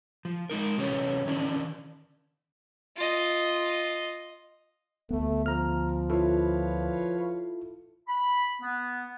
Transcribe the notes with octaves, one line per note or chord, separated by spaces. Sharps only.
F3
G#3 D#4 A#4
C3 E3 C#4 A4 B4 C#5
D#3 E3 C#4 D4
F4 D#5
D2 A3 B3
F3 A#5 F6
E4 F4 A4 B4 C#5 F5
B5
B3